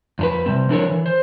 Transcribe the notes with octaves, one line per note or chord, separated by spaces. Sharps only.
F2 D4 B4
C3 G3 C4
F3 D4 E4 A4 A#4 C#5
E3
C5